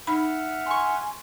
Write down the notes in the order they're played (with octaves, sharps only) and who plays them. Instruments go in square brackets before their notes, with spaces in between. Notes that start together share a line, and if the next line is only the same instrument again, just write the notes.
[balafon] D#4 B5 [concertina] E5 F#5 F6
[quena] G#5 [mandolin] C6 C#6